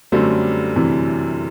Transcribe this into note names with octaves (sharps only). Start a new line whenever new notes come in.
F#2 D3 F#3 G3 A3 C4
C3 E3